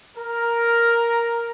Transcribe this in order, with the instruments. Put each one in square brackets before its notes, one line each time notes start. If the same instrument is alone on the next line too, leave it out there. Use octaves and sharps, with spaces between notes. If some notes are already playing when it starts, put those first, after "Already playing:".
[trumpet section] A#4